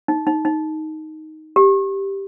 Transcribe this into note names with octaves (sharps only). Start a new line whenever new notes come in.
D#4
D#4
D#4
G4